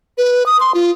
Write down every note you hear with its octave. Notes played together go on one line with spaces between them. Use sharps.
B4
D#6
C6
F4